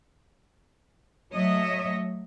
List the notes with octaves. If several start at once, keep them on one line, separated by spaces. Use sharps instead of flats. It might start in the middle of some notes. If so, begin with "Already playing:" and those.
F#3 A3 C#5 D#5 E5